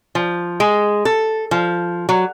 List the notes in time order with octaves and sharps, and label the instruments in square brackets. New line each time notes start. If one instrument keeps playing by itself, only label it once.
[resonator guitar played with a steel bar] F3
G#3
A4
F3
F#3